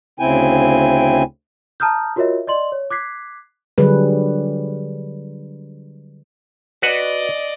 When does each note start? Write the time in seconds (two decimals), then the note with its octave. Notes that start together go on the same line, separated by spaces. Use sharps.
0.20 D2 C#3 C4 E4 G5 G#5
1.80 A5 A#5 D#6 F6 G6
2.16 F4 F#4 A#4 C#5 D#5 E5
2.47 D5 D#5 C6 F#7
2.72 C#5
2.90 D6 F#6 G#6 B6 C7
3.78 D3 F#3 G3 G#4 B4
6.82 F#4 B4 D5 D#5 F#5